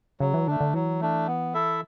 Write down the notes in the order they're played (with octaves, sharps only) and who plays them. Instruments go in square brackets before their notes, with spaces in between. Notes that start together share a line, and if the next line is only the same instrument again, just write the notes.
[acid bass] C#3 [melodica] F#3
[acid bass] E3
[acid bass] D3 [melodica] A3 D4
[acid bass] D3
[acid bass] E3 [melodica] F#3
[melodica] A3 D4
B3
E4 A4 E5